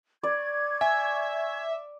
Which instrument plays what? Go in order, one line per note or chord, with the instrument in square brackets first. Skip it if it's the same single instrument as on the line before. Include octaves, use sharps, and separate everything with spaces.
[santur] D5 [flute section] C#6 G#6
[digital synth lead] E5 [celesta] G#5